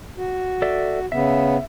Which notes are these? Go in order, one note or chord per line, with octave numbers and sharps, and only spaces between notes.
F#4
A4 D5 E5
C#3 B3 E5